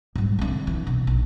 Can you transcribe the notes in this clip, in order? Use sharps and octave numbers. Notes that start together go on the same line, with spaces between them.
G#2 G3
C2 D3
E3
B2
A#1 D#4